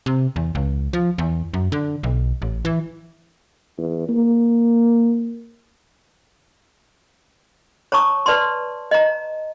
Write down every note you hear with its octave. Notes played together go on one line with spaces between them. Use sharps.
C3
E2
C#2
F3
E2
F#2
D3
B1
A1
E3
E2
A#3
C#5 A5 A#5 C#6 D#6
B4 D5 A5 C6
D#5 A#5